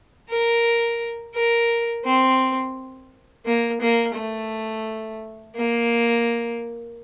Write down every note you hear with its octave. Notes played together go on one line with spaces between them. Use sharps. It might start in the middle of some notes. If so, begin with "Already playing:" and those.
A#4
A#4
C4
A#3
A#3
A3
A#3